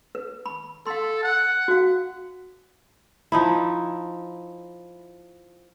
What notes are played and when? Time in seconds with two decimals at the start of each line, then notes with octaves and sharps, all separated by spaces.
0.15 B4
0.46 B5
0.87 A4 F5 C6
1.23 F#5
1.68 F#4 F5
3.32 F3 D#4 E4